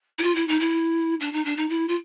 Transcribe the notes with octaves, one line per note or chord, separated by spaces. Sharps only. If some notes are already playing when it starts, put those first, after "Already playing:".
E4
F4
E4
D#4
E4
D4
D#4
D4
D#4
E4
F4